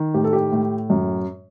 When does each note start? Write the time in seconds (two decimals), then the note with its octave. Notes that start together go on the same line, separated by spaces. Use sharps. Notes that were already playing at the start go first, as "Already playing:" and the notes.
Already playing: D#3
0.14 A2 G4
0.24 A4
0.33 G4
0.52 A2
0.90 F#2